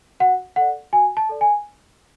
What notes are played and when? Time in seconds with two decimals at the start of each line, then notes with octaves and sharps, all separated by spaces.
0.20 F#4 F#5
0.56 A4 D5 F#5
0.93 F#4 G#5
1.17 A5
1.29 A4 D5
1.41 G#5